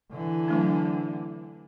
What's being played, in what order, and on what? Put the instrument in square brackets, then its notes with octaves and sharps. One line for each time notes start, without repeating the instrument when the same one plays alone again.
[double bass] D3 E3
[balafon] F#3 A3 D4